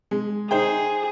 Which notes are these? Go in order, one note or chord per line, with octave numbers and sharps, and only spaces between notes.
G#3
D#4 G#4 C5 G5